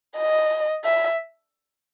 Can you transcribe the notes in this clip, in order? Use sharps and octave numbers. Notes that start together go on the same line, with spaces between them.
D#5
E5